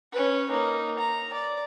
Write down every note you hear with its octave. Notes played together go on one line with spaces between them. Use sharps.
C#4 B4
A#3 D#4
A#5
D5